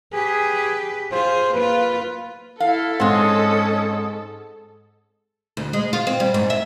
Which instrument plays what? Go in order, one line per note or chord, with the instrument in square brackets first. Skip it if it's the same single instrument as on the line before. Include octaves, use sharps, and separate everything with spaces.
[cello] G4 B4 [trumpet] G#4
[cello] F4 G#4 [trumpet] C5
[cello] A#3 F4 [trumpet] B4
[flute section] E4 F6 [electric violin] A4 [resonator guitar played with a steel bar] F5
[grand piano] G#2 F#5 [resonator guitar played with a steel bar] G#3 C4 [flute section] C#4 D#5 D#6
[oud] D2
G#3
F4
C4
G3
G#2
E5